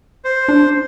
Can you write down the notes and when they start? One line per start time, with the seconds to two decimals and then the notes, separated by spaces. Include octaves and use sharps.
0.25 C5
0.48 D4